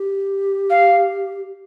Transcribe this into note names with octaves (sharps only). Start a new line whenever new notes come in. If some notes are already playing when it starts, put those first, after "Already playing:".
Already playing: G4
F5